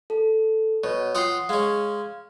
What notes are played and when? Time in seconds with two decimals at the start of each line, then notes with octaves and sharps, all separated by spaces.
0.10 A4
0.84 B2 C#5
1.15 F4 F#5 G5 D#6 C7
1.49 G#3 C#4 F5